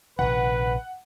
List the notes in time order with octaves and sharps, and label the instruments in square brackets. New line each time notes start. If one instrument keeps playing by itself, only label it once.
[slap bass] A#1 C3 D#3 [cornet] B4 [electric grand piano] F#5